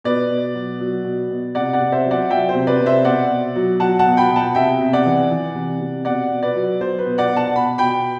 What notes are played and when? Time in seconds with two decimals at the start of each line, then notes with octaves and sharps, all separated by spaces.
0.04 B2 B4 D5
0.30 B2
0.55 F#3
0.80 F#3
1.04 B2
1.31 B2
1.55 C3 D5 F#5
1.73 D5 F#5
1.80 C3
1.92 C5 E5
2.05 F#3
2.11 D5 F#5
2.30 F#3 E5 G5
2.49 C5
2.55 C3
2.67 B4 D5
2.80 C3
2.86 C5 E5
3.05 B2 D5 F#5
3.30 B2
3.56 F#3
3.80 F#3 F#5 A5
3.99 F#5 A5
4.06 B2
4.17 G5 B5
4.30 B2
4.36 F#5 A5
4.55 C3 E5 G5
4.81 C3
4.93 D5 F#5
5.06 E3
5.31 E3
5.55 C3
5.81 C3
6.05 B2 D5 F#5
6.31 B2
6.43 B4 D5
6.55 F#3
6.81 F#3 C5
6.99 B4
7.05 B2
7.18 D5 F#5
7.31 B2
7.36 F#5 A5
7.55 B2 B5
7.78 B2 G5 B5